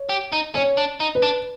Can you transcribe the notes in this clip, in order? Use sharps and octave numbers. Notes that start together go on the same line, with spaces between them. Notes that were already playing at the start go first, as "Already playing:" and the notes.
Already playing: C#5
G4
D#4
C#4 C#5
D4
D#4
B4
D4